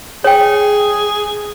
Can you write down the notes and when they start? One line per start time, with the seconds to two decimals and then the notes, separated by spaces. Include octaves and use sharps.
0.24 G#4 C#5 G5